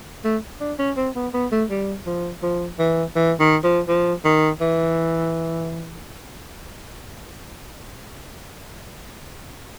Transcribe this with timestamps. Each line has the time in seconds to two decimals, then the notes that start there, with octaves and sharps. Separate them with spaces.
0.25 A3
0.61 D4
0.79 C#4
0.97 C4
1.15 B3
1.34 B3
1.52 A3
1.70 G3
2.06 F3
2.43 F3
2.79 E3
3.16 E3
3.40 D#3
3.64 F3
3.88 F3
4.25 D#3
4.61 E3